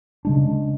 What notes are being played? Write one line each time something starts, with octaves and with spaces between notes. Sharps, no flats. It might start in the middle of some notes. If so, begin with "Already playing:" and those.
C#3 G#3 D4